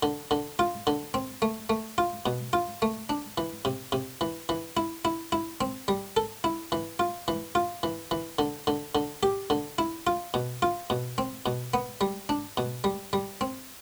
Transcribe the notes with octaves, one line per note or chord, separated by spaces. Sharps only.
D3
D3
F4
D3
C4
A3
A3
F4
B2
F4
A3
D4
E3
C3
C3
E3
E3
E4
E4
E4
C4
G3
A4
E4
E3
F4
E3
F4
E3
E3
D3
D3
D3
G4
D3
E4
F4
B2
F4
B2
C4
B2
B3
G3
D4
B2
G3
G3
C4